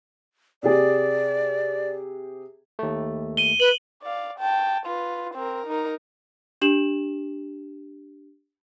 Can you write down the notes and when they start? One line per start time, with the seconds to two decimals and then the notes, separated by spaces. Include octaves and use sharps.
0.63 C3 G4 G#4 D5
2.79 D#2 A3
3.37 D#7 G7
3.60 B4 F#7
4.03 D5 F5
4.38 G5 A5
4.86 F4 B4
5.34 C4 A#4
5.67 D#4 A#4
6.61 D4 G4 E7 F#7